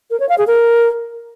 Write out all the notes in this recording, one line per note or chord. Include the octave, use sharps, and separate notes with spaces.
A#4
C#5
F5
G#4
A#4